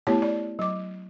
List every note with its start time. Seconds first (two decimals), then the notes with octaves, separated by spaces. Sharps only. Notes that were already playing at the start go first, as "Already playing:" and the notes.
0.07 A3 B3 E4 G4 C#5 A5
0.22 D5
0.59 F#3 D6